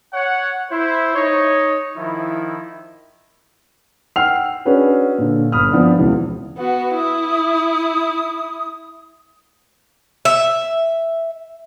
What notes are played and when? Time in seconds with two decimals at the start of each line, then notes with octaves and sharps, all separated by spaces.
0.13 C#5 F#5
0.70 E4 C5
1.15 D#4 C#5
1.96 D#3 F3 E4
4.16 F#5 G5 E6 F6 C7 F7
4.65 C#4 D4 F#4 G#4 B4
5.18 A#2 D3
5.52 G1 B5 D#6 F6
5.72 F3 B3 C4 D4
5.97 E1 C#2 E3 B3
6.57 B3 F#4
6.94 E4 D#6
10.25 E5